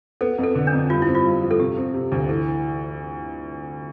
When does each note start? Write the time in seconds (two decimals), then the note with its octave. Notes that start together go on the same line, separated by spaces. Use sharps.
0.21 B3 A4
0.38 F2
0.43 A4
0.55 D3
0.67 D4
0.73 F2
0.90 G2 F4
1.02 E4
1.07 C4
1.15 F4
1.25 G2
1.42 F3
1.51 A4
1.59 C3 G4
1.77 C4
1.94 C3
2.12 D2
2.29 E3 A4